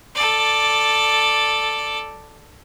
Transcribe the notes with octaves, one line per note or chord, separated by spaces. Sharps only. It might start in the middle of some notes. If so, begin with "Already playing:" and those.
A4 D5